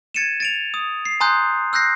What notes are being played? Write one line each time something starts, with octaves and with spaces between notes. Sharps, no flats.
G#6 A6 C#7 D#7 E7
A6 D7 F7
D#6
C7
G#5 A#5 C6 D#6 F#6 G6
E6 F#6 G6 A#6 C7